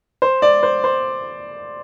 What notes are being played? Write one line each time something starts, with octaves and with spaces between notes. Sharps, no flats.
C5
D5
C5
C5